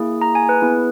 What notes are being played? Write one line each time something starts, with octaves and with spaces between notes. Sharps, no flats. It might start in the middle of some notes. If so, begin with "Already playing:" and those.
Already playing: A#3 E4 G#4
A#5
G#5
B4
B3 E4 G#4